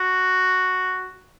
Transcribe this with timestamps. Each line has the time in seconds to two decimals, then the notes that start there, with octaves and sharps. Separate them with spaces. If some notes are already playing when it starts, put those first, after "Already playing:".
Already playing: F#4